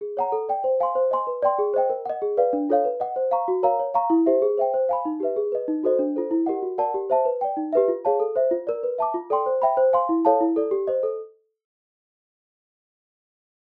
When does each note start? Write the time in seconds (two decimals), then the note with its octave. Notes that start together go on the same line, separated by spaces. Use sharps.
0.01 G#4
0.17 C#5 F#5 A#5
0.32 A4
0.49 D5 G5
0.64 C5
0.80 F5 G#5 C6
0.95 C5
1.11 D#5 G#5 C6
1.27 B4
1.42 D5 G5 C6
1.59 G#4
1.74 C5 D#5 G5
1.90 A#4
2.05 D#5 F#5
2.22 G#4
2.37 B4 D5 F5
2.53 D4
2.69 F4 A4 C#5 F5
2.85 B4
3.00 D#5 F#5
3.16 C5
3.31 F5 A#5 C#6
3.48 F#4
3.63 A#4 C#5 F5 A#5
3.79 C#5
3.94 F5 A#5 C#6
4.10 E4
4.26 G4 C5 E5
4.42 G#4
4.58 C5 E5 G5
4.74 C5
4.89 F5 G#5 B5
5.05 D#4
5.20 G4 B4 E5
5.36 G#4
5.52 B4 D#5
5.68 D#4
5.83 F#4 A4 C5 D#5
5.99 D4
6.15 F4 A4 C5
6.31 E4
6.46 G4 A#4 D#5 F#5
6.63 F#4
6.78 A#4 D5 F#5 A5
6.94 G4
7.10 C5 E5 A5
7.25 B4
7.41 D5 G5
7.57 D#4
7.73 G4 B4 E5
7.88 F4
8.05 G#4 C#5 F5 A5
8.20 A4
8.36 C5 E5
8.51 F4
8.67 A#4 D5
8.83 B4
8.98 E5 A5 D6
9.14 F4
9.30 A4 D5 G5 C6
9.46 C5
9.62 E5 G5 B5
9.77 C5
9.93 F5 G#5 C6
10.09 E4
10.25 A4 C#5 F5 A5
10.41 E4
10.56 A4 D5
10.71 G4
10.87 C5 D#5
11.03 A4